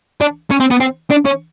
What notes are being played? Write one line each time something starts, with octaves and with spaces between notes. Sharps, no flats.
D4
C#4
C4
B3
C4
D4
C#4